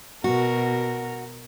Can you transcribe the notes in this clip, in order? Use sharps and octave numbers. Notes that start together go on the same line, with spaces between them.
B2 F#4 A#4